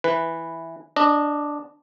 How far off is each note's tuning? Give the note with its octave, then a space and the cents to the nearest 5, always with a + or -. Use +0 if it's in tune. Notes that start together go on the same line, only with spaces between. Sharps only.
E3 +0 B4 +0
D4 +0 D#5 -20